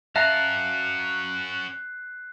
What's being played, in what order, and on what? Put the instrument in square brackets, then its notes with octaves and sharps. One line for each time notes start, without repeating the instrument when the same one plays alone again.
[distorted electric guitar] C#4 F#4 [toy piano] E5 [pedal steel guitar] F5 A5 A#5 [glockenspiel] F#6 C7